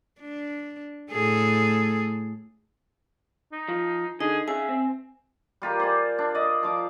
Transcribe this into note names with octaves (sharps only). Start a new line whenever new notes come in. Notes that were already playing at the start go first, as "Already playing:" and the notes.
D4
A2 G#4 A4
D#4
F3
D3 D#4 G#4 D#5
C#4 G#4 E5 G#5
C4
G3 F4 G4 A#4
C5 D5 G#5
D4
D5 D#5
F3 F5 D6